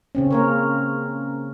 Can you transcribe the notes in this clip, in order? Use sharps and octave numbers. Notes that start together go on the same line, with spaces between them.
C#3 C4 C#4
A#3 A#4 C#5